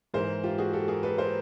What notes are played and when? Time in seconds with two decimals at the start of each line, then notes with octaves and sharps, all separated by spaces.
0.14 G#2 E3 A#4 C5
0.44 F4 G4
0.58 F#4 G#4
0.73 G4 A4
0.88 G#4 A#4
1.03 A4 B4
1.18 A#4 C5